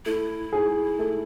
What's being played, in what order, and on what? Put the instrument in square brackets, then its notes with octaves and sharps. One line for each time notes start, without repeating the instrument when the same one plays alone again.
[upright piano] A3 [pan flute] E4
[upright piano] G#4
A3